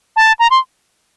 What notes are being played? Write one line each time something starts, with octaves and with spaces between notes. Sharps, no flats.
A5
A#5
C6